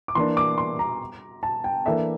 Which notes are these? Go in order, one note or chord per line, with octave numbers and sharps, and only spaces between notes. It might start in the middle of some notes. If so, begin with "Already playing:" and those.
D6
E3 A#3 D4 C6
D6
C6
A#5
A5
G5
E3 A#3 D4 A4 E5